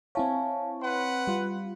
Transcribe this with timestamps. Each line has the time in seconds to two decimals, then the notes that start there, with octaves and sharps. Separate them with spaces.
0.15 C4 E4 C#5 F5 G#5 A5
0.81 B4 F#5 C6
1.27 G3 F4